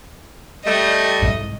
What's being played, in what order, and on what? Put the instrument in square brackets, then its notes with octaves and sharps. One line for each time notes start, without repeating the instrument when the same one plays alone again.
[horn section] G3 A3 [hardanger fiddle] D#5
[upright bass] C2 G#2